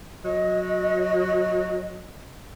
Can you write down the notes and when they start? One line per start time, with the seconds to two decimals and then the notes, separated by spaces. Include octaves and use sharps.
0.25 F#3 D#5